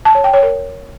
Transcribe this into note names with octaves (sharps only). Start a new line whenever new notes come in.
A5
C#5
G5
C#5
A#4